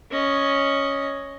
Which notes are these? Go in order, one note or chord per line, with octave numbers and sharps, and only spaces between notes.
C#4 D#5